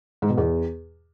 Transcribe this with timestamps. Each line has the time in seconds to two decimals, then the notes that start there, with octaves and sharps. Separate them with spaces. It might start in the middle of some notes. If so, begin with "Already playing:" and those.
0.22 G#2
0.30 B2
0.38 E2